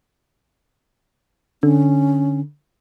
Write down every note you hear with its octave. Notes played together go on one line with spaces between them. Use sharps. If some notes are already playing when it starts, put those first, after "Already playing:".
D3 C#4